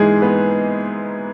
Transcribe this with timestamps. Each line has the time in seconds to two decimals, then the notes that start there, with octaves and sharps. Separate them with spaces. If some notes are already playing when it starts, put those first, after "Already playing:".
Already playing: G#2 E3 G#3 D#4 G#4
0.22 B3 B4